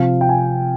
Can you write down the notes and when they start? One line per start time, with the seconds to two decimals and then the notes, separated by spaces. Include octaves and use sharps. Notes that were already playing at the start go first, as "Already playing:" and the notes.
Already playing: C3 F3 C4 F5
0.21 G5
0.29 G#5